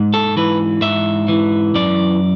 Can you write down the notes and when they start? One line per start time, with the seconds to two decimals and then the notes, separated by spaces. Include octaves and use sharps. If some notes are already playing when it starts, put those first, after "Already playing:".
Already playing: G#2
0.14 A4
0.37 E3 B4
0.82 G#2 E5
1.28 E3
1.75 F#2 D5